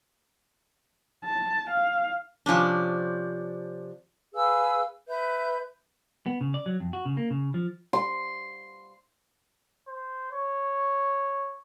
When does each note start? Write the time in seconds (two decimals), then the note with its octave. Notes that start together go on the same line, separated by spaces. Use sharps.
1.25 A5
1.70 F5
2.46 C3 F3 C#4 D4
4.34 G#4 B4 F5 E6
5.08 B4 E5 G6
6.26 B3
6.41 C#3
6.54 D5
6.66 F#3
6.80 F2
6.93 F#4
7.06 C#3
7.17 A#3
7.30 C#3
7.54 F3
7.93 C6
9.87 C5
10.32 C#5